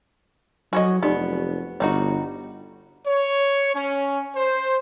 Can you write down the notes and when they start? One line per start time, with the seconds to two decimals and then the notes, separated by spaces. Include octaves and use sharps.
0.73 F#3 F#4 A4 C#5 D#5 G#5
1.03 F1 B3 D#4 G4 D5
1.80 G1 G3 D#4 F#4 C#5
3.07 C#5
3.75 C#4
4.36 C5